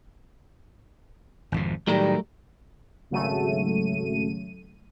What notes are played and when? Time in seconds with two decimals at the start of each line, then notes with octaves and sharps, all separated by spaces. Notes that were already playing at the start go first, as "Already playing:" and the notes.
1.52 G#1 F2 C3
1.87 A2 D#3 F#3 G3 A3 A#4
3.10 G#1 C#3 F#3 A3 D#7